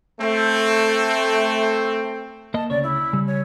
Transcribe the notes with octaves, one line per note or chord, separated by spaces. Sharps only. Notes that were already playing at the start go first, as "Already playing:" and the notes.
A3 C4
A#3 D#5 A5
D2 C#3 C#5 D5
E4
C#3 G3
C#5